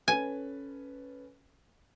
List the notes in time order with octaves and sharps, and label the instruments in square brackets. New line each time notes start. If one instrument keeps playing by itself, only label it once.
[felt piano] C#4 A4 B4 [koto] G#5